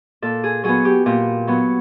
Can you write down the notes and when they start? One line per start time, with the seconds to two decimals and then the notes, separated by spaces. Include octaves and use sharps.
0.22 A#2 A4
0.44 G#4
0.64 F#3 B3 G#4
0.85 G4
1.06 A#2 G4
1.47 F#3 B3